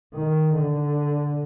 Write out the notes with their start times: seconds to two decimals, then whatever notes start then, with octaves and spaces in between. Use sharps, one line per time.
0.15 D#3
0.54 D3